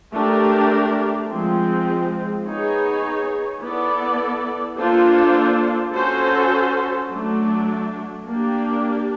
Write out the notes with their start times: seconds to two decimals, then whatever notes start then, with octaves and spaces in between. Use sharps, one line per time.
0.14 A3 D4 G4 A#4
1.30 F3 G#3 C4
2.46 B3 D#4 G#4 C#5
3.62 B3 E4 A4 D5
4.78 A#3 D4 F4 A4 C5
5.94 C#4 F#4 A4 C5
7.10 F#3 A3 D4
8.27 A#3 D4 G4